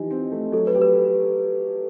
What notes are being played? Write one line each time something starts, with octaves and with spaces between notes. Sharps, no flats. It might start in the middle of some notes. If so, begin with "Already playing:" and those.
Already playing: E3 F3 D#4 G4
C4
A3
F#3 A4
B4
G4
B4